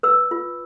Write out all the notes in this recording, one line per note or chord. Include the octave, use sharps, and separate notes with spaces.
B4 E6
F4